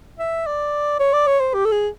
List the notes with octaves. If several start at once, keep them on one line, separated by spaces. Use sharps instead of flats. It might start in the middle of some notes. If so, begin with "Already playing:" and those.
E5
D5
C#5
D5
C#5
C5
G4
A4
G#4